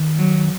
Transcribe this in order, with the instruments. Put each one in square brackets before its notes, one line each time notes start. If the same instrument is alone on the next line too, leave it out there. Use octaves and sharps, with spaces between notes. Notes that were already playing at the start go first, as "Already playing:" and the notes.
Already playing: [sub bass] D#3
[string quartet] F#3